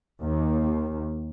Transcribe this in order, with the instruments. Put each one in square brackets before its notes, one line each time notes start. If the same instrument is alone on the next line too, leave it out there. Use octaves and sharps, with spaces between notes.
[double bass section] D#2